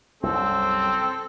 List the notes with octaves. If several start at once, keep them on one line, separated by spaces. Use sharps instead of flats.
C2 F#2 C4 A4